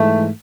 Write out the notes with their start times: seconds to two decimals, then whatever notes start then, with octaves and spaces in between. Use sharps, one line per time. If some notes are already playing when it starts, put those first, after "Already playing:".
Already playing: G#2 E3 A3